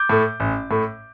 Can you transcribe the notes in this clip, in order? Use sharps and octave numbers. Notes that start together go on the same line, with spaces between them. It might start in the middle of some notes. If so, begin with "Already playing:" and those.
Already playing: D6 G6
A2 A3
A1
A2 A3